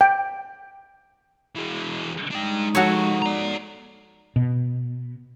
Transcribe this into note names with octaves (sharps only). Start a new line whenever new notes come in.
G5
E3 G#3
G#3 D4 D#4 G5
F3 F#4 A4 C#5 F#5
D5 A#5
B2